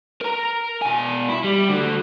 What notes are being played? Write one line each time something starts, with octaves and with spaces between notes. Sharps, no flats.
A#4 A#5
B2 G#5
E4
G3
D3 F#4